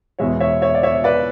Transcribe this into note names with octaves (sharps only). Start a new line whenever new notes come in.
E2 B2 G#3 C#5 E5
C#5 E5
C#5 E5
D5
C#5 E5
B4 D5